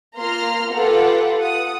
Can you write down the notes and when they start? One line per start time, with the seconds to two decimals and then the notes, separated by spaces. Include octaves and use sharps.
0.19 A#3 F4 A#5 C6 F6
0.72 F4 G4 A4 B4 F#5
1.40 F#5 D#6